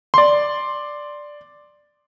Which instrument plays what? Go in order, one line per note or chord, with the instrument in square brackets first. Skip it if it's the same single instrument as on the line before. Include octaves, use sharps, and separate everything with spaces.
[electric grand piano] D5 C6